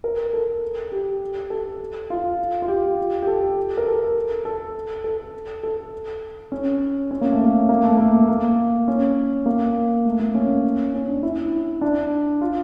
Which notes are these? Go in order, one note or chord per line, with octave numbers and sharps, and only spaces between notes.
A#4
A4
G4
A4
F4
F4
G4
G4
A4
A#4
A4
A4
A4
A4
C#4
C#4
A#3
A3
A#3
A#3
A3
A#3
A#3
C#4
A#3
A3
A#3
C#4
C#4
D4
E4
D4
F4